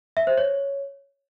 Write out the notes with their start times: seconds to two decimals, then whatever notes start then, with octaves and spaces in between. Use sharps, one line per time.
0.17 E5
0.27 C5
0.38 C#5